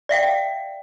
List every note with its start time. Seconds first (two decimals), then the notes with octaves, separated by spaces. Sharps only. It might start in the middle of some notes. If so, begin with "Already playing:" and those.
0.09 D5 E5 F5 G5